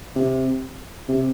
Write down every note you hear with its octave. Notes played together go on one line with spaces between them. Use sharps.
C3
C3